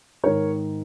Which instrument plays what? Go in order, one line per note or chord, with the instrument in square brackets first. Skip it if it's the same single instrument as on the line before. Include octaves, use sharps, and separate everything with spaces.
[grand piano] G#2 D#3 A#4 C#5